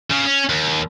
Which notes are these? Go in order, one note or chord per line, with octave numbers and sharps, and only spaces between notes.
C#3
C#4
D#2